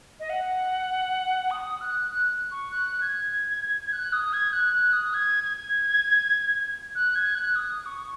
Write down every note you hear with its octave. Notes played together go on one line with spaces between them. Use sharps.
D#5
F#5
D#6
F#6
F#6
C#6
F#6
G#6
F#6
D#6
G#6
F#6
F#6
D#6
G#6
G#6
F#6
G#6
F#6
D#6
C#6